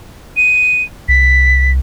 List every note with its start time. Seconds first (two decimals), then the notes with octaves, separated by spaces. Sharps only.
0.37 D#7
1.08 C2 B6